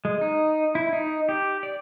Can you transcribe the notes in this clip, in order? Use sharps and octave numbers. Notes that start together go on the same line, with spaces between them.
G#3
D#4
E4
D#4
G4
D5